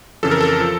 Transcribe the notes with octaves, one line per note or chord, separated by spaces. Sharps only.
F2 C#3 E3 A4
A#4
A4
F3